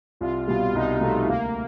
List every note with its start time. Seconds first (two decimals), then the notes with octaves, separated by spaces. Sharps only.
0.21 C2 F4
0.48 B2 G3 F4
0.61 F4
0.75 C2 D#4
1.01 B2 G3 A3
1.28 D2 A#3